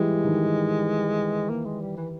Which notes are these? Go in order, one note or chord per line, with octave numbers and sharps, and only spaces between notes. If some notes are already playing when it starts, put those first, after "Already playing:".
Already playing: E3 G3 G#3
D#3
A#3
G#3
G3
E3